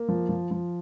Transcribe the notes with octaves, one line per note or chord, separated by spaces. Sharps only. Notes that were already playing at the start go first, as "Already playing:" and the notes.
Already playing: A#3
F3
F3
F3